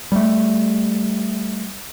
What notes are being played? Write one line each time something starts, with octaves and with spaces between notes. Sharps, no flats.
G3 A3